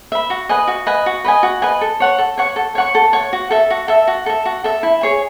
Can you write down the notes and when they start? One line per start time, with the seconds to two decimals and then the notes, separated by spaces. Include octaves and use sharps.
0.12 E5 B5
0.30 F#4
0.49 B4 D#5 G#5
0.68 F#4
0.87 B4 D#5 G#5
1.06 F#4
1.24 B4 D#5 G#5
1.43 F#4
1.62 B4 D#5 G#5
1.81 A4
2.00 C#5 F#5 C#6
2.18 A4
2.38 C#5 F#5 C#6
2.56 A4
2.75 C#5 F#5 C#6
2.95 A4
3.13 C#5 F#5 C#6
3.33 F#4
3.50 A4 E5
3.70 F#4
3.88 A4 E5
4.07 F#4
4.26 A4 E5
4.45 F#4
4.64 A4 E5
4.83 E4
5.01 G#4 C#5 G#5